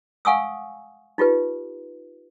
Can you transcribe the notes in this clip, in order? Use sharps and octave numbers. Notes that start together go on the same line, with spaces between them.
F5 F#5 G#5 C#6 D#6 E6
D#4 F4 G4 B4